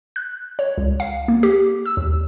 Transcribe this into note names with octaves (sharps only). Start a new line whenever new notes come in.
F#6
C#5
C#2
F5
A#3
G4
E6
D#2